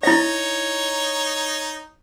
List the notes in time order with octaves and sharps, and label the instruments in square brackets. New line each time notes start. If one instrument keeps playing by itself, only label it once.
[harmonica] D#4 C#5 [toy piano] E4 E5